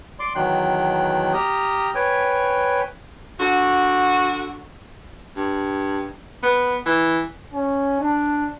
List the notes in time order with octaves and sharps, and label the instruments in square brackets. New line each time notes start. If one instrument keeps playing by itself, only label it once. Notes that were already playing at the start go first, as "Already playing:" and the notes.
[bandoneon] D5 C6 D6
E2 B2 D#3 F#3 G5 F#6
G4 G5 A#5 D#6 F6
B4 C#5 G5 G#5
[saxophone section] D3 F#4
[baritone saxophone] G2
B3
E3
[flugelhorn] C#4
D4